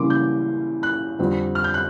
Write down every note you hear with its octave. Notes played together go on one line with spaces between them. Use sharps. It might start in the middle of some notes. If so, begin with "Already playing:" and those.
Already playing: C#3 E3 G3 A#3 C#4 C6 D6
G6
F#6
F2 D3 G3 C4
F6
G6
F#6